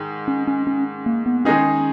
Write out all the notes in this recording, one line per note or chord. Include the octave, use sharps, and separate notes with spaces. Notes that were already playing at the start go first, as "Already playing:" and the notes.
Already playing: G#2 D#3
C#4
C#4
C#4
A#3
B3
D#3 G#3 C#4 D#4 G#4